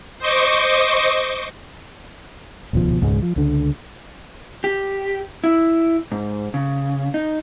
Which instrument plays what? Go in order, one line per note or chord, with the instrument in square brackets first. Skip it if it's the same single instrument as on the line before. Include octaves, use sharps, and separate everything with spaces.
[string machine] C5 D#5 C#6 D6
[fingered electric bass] D#1 C#2 B2 F3
E1 C#2 G#2 G#3
F3
C#2 D3
[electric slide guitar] G4
E4
G#2
C#3
D#4